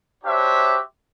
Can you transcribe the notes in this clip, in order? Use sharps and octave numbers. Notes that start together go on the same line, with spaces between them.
D4 F#4 G4 C5 C#5 E5